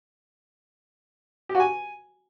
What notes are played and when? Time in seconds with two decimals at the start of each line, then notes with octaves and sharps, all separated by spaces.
1.49 G4
1.55 F#4
1.60 G#5